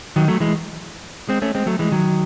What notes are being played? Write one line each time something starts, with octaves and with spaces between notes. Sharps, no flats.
D#3 F#3
F#3 A3
E3 G#3
G#3 C4
A3 C#4
G#3 C4
F#3 A3
E3 G#3
D#3 F#3